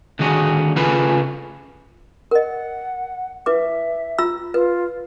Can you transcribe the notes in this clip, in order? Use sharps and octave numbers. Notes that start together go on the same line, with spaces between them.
D3 D#3 F#4 G#4
C#3 C#4 F4 G#4 A4 B4
A#4 D#5 F#5
E4 B4 E5 D6
F4 A#5 E6
F4 B4